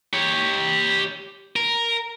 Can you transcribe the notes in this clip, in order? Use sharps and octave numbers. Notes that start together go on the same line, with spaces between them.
G4 C#5
A#4